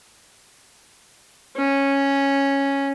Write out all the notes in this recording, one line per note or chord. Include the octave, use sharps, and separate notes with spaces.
C#4